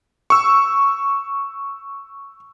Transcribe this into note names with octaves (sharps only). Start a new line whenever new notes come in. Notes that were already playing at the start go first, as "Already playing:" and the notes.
C#6 E6